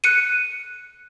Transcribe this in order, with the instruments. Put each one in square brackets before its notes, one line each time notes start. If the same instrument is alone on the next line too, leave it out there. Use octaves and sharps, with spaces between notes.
[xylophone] F#6 C#7 D#7